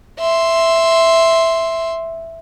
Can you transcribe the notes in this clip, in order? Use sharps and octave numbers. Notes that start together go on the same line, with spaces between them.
E5 C6